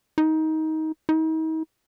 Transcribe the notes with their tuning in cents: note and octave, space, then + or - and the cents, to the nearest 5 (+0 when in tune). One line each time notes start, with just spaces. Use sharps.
D#4 +20
D#4 +40